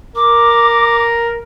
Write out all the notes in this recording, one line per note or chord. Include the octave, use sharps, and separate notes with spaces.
A#4 D6